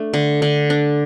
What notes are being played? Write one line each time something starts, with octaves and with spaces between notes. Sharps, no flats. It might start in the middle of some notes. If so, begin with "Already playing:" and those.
Already playing: A3 D4
D3
D3
D4